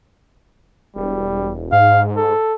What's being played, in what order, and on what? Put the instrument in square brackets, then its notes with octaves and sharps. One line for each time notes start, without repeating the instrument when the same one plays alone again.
[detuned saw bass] E1 [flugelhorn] G3
[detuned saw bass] G#2 [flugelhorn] F5
[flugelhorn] A4